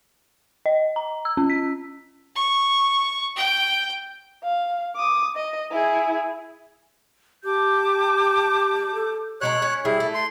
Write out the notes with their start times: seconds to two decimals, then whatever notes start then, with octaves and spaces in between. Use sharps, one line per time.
0.66 D#5
0.96 A#5
1.25 E6
1.37 C#4
1.50 B6
2.35 C#6
3.36 G5
4.43 F5
4.95 D6 D#6
5.36 D#5
5.71 E4 G#4
7.44 G4 A5 D6 G6
8.94 A4
9.41 B2 G#3 C#5 A#5 F#6
9.62 C#4
9.85 G3 E4 G#4
10.00 A3
10.15 C6